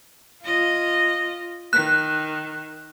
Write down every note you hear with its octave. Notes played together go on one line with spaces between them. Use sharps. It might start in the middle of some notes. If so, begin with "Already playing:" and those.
F4 D#5
D#3 F#6